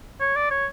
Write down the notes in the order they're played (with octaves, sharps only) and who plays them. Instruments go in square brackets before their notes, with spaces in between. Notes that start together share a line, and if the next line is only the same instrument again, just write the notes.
[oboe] C#5
D5
C#5